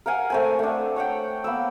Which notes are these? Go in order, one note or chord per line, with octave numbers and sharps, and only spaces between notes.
A#4 F5 F#5 G#5
A3 C4 G#5
A3 D4
C#5 F#5 G5
A#3 B3 E6